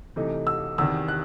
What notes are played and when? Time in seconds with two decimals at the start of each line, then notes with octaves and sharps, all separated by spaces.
0.16 C3 E3 A3 D#4
0.47 E6
0.78 E2 C3 D#3 E6
1.08 F#6